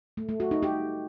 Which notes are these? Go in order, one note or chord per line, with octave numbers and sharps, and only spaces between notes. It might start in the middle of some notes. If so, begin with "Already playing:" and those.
A3
A3
F#4
D#4
G4